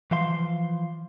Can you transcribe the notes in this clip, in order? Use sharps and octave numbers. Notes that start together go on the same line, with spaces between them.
E3 F3 F5 C6